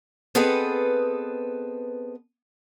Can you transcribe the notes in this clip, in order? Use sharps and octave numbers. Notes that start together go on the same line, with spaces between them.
B3 C4 G#4 A4 B4 D#5